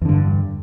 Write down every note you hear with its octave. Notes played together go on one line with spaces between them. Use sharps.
E2 G2 D3